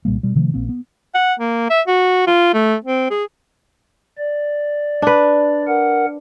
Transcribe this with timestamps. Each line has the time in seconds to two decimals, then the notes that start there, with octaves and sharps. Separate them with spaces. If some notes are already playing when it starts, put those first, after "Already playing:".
0.05 C2 A#2 G3 A#3
0.23 B2 G3
0.35 C3 D#3 F3 A3
0.54 A#1 A#2 A#3 C4
0.69 B3
1.15 F#5
1.40 A#3
1.70 E5
1.88 F#4
2.27 F4
2.54 A3
2.84 C4
3.11 G#4
4.18 D5
5.02 D4 B4
5.67 A#4 F#5